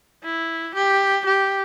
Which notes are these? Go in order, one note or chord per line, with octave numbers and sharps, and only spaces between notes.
E4
G4
G4